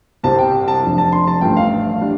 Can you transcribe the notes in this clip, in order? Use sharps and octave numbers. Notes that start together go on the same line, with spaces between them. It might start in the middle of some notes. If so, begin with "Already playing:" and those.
C2 C3 G3 C4 A5
G5
A5
F1 F2 F3 D4
A5
C6
A5
A1 G2 F3 A3 G5
F5
G3 D4